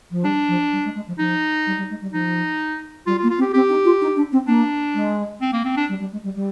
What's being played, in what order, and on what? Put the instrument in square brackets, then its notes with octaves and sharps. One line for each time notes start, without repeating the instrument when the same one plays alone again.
[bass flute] F3
[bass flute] G3 [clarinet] D4
[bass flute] F3
G3
G#3
G#3
F3
[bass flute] F3 [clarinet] D#4
[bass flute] G3
G3
G#3
G3
[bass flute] F3 [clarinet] D#4
[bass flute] G3 [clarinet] F4
[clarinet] F4
[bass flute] A#3
[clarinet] F4
[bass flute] C4
[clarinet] G4
[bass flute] C4 [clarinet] G4
[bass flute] D#4
F4
D#4
D4
C4
[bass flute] A#3 [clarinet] D4
[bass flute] G#3
[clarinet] C4
A#3
C4
D4
[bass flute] G3
G3
G#3
G3
G3